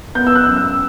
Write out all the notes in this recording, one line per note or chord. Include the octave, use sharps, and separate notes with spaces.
B3 G6
E6
F#6
F#2
E6